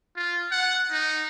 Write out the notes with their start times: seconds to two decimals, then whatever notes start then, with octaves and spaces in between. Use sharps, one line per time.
0.16 F4
0.52 F#5
0.91 D#4